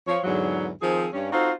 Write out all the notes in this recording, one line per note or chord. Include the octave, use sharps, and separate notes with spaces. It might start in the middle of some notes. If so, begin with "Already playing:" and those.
F3 C#5
E2 G#2 D3 F#3
D#3 F3 C4 G#4
G2 C#4
C4 D#4 F4 F#4 A4 C5